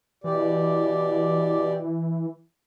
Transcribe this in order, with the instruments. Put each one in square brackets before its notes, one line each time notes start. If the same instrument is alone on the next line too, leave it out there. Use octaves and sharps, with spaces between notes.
[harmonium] B2 G4 D5 [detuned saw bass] E3